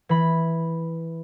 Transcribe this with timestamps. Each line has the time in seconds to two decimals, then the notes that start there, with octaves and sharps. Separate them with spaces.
0.09 E3 B5